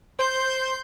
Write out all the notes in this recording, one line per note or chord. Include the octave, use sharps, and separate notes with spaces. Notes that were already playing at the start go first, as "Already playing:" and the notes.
C5 C6 G6